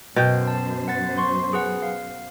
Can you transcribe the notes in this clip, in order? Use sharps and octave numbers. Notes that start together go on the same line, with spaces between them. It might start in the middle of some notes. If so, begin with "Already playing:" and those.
F#2 B2 C5 G5
A5
F#5 A6
C6 C#6
G#4 B4 F#5
F5